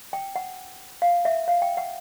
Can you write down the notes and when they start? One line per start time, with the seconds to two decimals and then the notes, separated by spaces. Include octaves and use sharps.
0.13 G5
0.36 F#5
1.02 F5
1.25 E5
1.48 F5
1.62 G5
1.77 F#5